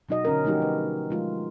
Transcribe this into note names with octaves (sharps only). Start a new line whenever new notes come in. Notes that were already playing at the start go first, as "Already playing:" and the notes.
B2 F#3 D#4 F#4 D#5
D3 C#4 A#4
F3 F#3 A3 D#4 F#4 G4
B4
F3 G#3 F4